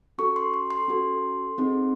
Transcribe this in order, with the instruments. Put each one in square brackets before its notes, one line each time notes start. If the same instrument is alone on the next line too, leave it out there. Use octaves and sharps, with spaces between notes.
[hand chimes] C#4 F#4 A4 C#6
C6
C6
C6
C#4 F#4 A4
C4 D#4 G#4